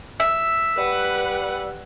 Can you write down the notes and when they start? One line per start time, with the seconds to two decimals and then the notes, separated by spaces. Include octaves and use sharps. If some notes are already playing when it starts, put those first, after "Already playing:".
0.20 E5
0.78 G3 B4 F#5